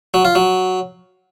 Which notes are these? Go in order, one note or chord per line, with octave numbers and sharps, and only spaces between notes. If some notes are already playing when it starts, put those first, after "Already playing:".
F#3
F4
F#3